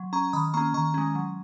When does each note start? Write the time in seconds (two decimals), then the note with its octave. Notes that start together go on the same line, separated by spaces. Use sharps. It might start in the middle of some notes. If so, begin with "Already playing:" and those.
Already playing: F#3
0.13 C#4 A#5 C#6
0.33 D#3 B5 D#6
0.54 A#3 C#4 A#5 C#6
0.74 D#3 A#5 C#6
0.94 G#3 C#4
1.15 F#3